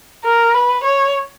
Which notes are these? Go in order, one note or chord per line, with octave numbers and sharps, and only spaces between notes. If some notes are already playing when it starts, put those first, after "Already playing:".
A#4
B4
C#5